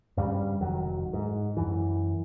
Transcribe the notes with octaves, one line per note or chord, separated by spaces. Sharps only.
G2 C#3 G3
F1 D#3 F#3
G#2
F#2 E3